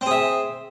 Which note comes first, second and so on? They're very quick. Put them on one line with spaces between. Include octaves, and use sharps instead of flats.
C4 G#4 E5